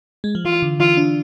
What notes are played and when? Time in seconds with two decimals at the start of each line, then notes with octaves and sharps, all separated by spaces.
0.24 G#3
0.35 F3
0.45 E3 F4
0.62 D3
0.80 E3 F4
0.97 D4